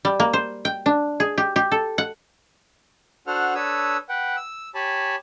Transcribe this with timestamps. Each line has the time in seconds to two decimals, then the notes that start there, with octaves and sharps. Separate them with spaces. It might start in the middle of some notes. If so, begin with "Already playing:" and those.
0.05 G3
0.20 A#3
0.33 C5
0.65 G5
0.86 D4
1.20 G#4
1.38 G4
1.56 G4
1.72 A4
1.98 F#5
3.27 D4 F#4 A4 C5 F#5 F6
3.55 D4 A4 B4 C#5 D#6 E6
4.09 B4 F#5 G5
4.37 E6
4.75 G4 C#5 G#5 A5 B5